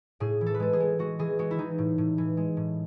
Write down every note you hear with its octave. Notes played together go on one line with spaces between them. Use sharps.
A2 G#4
E3
A4
B4
G#3 A4
G#4
G#3
G#3 F#4
E3 G#4
G#3 F#4
E4
E3 D#4
A2
A2
E3
G#3
A2